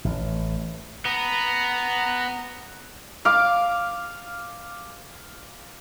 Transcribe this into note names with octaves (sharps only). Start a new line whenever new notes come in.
A1
B3 A#5
F5 D6